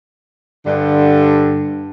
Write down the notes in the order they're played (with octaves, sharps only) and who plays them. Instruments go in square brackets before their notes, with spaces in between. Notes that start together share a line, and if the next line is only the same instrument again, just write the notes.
[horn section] G2 D3